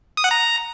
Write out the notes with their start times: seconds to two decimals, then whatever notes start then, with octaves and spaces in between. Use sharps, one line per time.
0.17 D#6
0.24 F#5
0.31 A#5